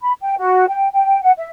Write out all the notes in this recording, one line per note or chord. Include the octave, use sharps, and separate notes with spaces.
B5
G5
F#4
G5
G5
F#5
E5